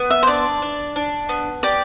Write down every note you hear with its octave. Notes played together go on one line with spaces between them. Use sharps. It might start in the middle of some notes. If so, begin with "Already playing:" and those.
Already playing: B3
E5
C5
D4 D5
D4
D4
B3
G4 D5